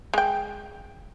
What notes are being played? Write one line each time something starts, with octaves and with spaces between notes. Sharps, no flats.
G#3 G5